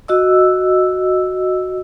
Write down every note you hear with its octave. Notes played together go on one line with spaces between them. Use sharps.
F#4 D#5 E6